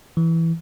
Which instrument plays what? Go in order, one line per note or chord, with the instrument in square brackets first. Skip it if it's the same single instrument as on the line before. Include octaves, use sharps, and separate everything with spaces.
[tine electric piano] E3